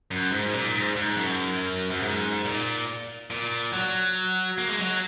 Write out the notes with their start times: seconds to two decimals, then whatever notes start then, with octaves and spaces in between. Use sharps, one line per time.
0.11 F#2
0.32 G#2
0.54 A#2
0.75 G#2
0.96 G#2
1.17 F#2
1.90 F#2
2.02 G#2
2.45 A#2
3.30 A#2
3.73 F#3
4.58 A#3
4.69 G#3
4.79 F#3